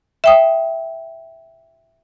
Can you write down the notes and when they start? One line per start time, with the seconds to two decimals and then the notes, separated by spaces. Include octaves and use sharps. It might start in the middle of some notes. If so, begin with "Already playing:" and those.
0.24 E5 G5 D#6